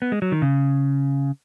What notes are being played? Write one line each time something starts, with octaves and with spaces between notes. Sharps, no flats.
B3
G#3
F#3
D#3
C#3